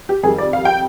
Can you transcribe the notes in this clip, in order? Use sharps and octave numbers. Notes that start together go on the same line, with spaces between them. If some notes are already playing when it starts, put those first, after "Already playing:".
G4
F2 D#3 G3 G#4
D5
F5
G5